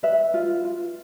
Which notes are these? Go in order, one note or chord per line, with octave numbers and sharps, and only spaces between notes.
B4 E5
F4
F4